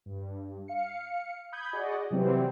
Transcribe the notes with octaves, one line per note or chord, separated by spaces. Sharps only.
G2
F5 C#7
B5 D#6 G6 G#6
F#4 G#4 D5 D#5 F#5
C3 E3 F#3 G3 C4